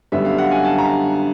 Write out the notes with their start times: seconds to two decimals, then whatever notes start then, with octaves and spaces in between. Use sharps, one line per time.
0.12 F#2 D3 G3 B3 E5
0.25 F5
0.38 F#5
0.51 G#5
0.64 A5
0.78 A#5